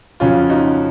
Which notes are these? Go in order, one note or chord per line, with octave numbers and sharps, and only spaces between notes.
F2 C#3 F#3 C#4 F4
D#4 F#4